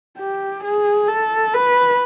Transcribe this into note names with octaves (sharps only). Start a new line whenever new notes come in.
G4
G#4
A4
B4